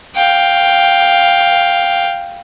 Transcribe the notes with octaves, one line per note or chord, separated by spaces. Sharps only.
F5 G5